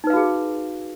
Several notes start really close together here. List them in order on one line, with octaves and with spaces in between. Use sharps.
D#4 B4 F5 F#4 G#4